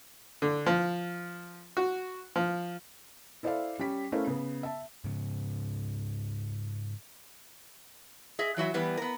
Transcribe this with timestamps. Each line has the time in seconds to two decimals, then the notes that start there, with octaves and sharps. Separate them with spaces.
0.42 D3
0.66 F3
1.77 F#4
2.36 F3
3.43 E4 A4 C5 D5 E5 F5
3.79 G3 C#4 B6
4.12 A3 C#4 E4 A#4 C5 F5
4.27 C#3 B3
4.63 E5 A5
5.04 G#2 C#3
8.39 G#4 D#5 E5
8.57 E3 F#3 F#4 E5
8.74 E3 G3 B3
8.97 B3 A#4